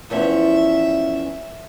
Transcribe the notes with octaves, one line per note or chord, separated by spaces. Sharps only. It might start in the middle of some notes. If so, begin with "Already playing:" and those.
E2 F3 C#4 E5